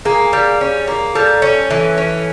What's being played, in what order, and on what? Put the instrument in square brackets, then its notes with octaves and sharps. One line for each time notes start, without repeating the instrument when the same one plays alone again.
[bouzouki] A#3 [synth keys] G#4
[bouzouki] G3
C#4
A#3
[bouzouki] G3 [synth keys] A4
[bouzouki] C#4
E3
C#4